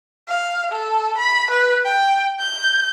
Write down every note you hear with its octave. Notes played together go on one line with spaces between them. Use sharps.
F5
A4
B5
B4
G5
G6